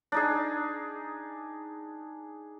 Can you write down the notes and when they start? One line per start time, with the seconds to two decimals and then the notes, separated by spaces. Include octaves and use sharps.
0.12 D4 D#4 G#4